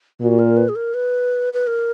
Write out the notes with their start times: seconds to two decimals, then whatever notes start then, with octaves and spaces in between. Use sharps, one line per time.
0.21 A#2 F#4
0.39 A#4
0.57 B4
0.69 G#4
0.76 A#4
0.94 B4
1.53 B4
1.67 A#4